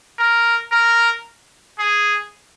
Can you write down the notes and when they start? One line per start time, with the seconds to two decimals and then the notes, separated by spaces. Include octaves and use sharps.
0.19 A#4
0.72 A#4
1.79 G#4